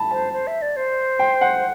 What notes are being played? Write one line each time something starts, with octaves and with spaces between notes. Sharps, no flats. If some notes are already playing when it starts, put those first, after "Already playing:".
Already playing: A5 B5
C5 A5
C5
E5
D5
C5
G5
F#5